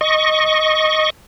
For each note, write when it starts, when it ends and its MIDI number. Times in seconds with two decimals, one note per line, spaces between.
0.01 1.10 75
0.01 1.10 85